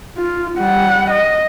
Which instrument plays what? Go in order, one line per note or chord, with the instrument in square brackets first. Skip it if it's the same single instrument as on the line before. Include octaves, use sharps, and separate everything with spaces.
[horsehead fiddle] F4
G3 F#5
D#5